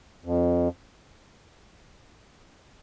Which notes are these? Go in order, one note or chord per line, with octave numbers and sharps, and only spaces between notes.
F2